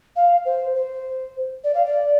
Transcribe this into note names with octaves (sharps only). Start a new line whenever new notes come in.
F5
C5
C5
D5
F5
D5